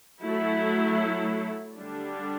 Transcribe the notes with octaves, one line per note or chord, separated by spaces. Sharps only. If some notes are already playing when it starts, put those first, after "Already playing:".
F#3 A3 E4 A4
D3 G3 D4